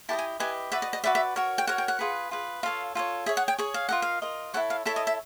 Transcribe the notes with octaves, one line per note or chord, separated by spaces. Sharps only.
E4 G4 B4 D#5 A5
G#5
E4 G4 B4 D#5 G#5
F#4 B4 D5 E5
D#5
D#5
F#4 B4 D5 E5
E5
F#4 A#4 C#5
G5
F#4 A#4 C#5 F#5
G5
F#5
F4 G#4 B4
F4 G#4 B4
F4 A4 C#5 F5
F4 A4 C#5
G#4 C#5 E5
F#5
G5
G#4 C#5
F5
F4 A#4 D#5 F#5
F5
F4 A#4 D#5
E4 A4 C#5 F#5
F5
E4 A4 C#5 E5
D#5
E5